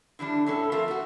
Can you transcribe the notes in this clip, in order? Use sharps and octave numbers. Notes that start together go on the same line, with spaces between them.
D3 E3 G3 D4
A2 E3 C#4 A4
F2 F4 A#4 E5
A3 F#4